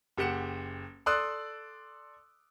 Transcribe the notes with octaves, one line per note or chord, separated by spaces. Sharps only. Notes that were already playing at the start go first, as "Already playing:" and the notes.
F#1 G4 F#5 C#7 E7
A4 D5 C6 D#6 E6 F#6